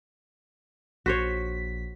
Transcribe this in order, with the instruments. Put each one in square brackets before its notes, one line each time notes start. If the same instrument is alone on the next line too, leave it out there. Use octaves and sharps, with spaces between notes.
[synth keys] A#1 B6 [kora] F#4 C5 C#5